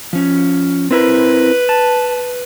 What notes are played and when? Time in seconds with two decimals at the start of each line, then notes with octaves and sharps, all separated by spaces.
0.13 F3 C#4
0.91 C4 E4 A#4 B4
1.69 A5